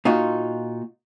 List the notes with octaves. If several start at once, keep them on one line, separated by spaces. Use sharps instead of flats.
A#2 D#4 F4 F#4